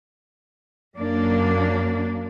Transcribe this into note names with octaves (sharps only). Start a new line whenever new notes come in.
F#2 A#3 D4